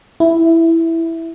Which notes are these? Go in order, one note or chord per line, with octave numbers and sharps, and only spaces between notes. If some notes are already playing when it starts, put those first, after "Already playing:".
E4